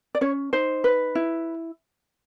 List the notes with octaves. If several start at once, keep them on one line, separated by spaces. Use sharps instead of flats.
D5
C#4 C#5
D#4 C5
B4
E4